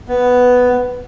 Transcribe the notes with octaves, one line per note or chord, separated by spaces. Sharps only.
B3